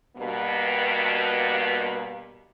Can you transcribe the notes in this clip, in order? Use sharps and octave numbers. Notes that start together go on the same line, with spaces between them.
G2 B2 A#3